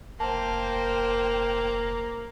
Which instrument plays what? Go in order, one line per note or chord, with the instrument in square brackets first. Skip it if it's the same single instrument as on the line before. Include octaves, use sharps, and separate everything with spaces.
[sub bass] F1 [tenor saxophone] A#3 [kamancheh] C5 G5 [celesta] A5